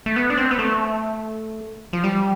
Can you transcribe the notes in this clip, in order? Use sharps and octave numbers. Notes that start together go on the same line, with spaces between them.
A3
B3
D4
C4
B3
A3
F3
G3